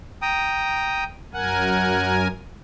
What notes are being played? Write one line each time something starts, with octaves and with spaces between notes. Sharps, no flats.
G5 A#5 D#6
F#2 A#4 F#5 G#5